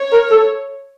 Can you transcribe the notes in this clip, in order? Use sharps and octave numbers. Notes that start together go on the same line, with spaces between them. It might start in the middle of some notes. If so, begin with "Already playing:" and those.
Already playing: C#5
A#4
A4